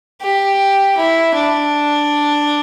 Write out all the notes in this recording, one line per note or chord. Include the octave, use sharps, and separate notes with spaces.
G4
E4
D4